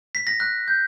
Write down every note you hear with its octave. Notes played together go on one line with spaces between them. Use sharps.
B6
A#6
F#6
G6